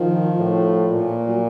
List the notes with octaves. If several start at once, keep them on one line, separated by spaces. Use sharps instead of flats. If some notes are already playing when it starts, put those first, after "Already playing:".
Already playing: D#3 F3
A2
A#2
F#3